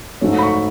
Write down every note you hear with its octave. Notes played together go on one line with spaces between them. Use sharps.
G#2 F#3 A3 C#4
B5
C#6